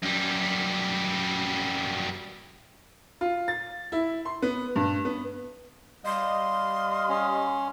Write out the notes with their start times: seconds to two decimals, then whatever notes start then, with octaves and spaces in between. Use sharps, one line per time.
0.03 F#2 G3
3.21 F4
3.48 A6
3.92 E4
4.25 C6
4.42 B3
4.76 G2
5.05 B3
6.06 G3 D#5 F5 C6
7.09 C#4